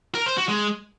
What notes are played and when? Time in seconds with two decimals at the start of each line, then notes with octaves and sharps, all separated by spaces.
0.15 A#4
0.26 C5
0.37 F#4
0.49 G#3